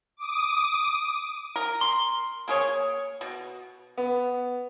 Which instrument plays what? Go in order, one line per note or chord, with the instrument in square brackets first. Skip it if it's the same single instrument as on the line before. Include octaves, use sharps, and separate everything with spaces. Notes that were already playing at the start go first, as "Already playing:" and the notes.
[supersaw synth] D6 D#6
[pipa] A#4
[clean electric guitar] C6
[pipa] A#3 G#4 C#5
B2
[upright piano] B3